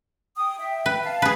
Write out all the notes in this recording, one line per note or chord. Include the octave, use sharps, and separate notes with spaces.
G5 D#6
E5 G5
B4
F5 A5
G#4 B4